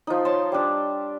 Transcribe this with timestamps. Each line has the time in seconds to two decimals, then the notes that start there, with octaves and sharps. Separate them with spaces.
0.07 F3 D#4
0.25 C#5 A5 C6
0.52 G3 D4